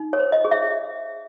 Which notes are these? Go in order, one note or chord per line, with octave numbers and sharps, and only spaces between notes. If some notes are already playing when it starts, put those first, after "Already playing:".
Already playing: D#4
C#5
C5
D#5
G#4
E5